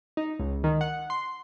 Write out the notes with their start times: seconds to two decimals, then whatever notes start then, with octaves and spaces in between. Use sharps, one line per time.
0.17 D#4
0.39 C#2
0.64 D#3
0.81 F#5
1.10 C6